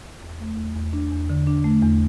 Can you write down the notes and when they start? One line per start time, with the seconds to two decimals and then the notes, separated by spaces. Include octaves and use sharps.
0.22 E2
0.40 A3
0.57 E2
0.75 E2
0.93 D4
1.12 E2
1.29 D3
1.47 D4
1.64 A3
1.83 E2